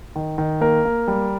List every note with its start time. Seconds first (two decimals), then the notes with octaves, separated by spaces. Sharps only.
0.15 D#3
0.38 D#3
0.61 A#3 A#4
0.85 A#3
1.08 G3